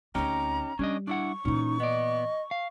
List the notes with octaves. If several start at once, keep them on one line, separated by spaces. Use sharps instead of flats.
D2 C4 C#4 D#4 G4 A#5
G3 C#4 D4 D#5
D4 E4 F#5 C#6
A#2 E3 C#4 D#4
B3 D5 D#5
F5